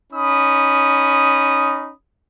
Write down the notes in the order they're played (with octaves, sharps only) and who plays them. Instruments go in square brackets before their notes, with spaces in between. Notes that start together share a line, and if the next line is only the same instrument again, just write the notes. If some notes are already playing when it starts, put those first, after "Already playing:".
[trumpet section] C#4 D#4 B5 D#6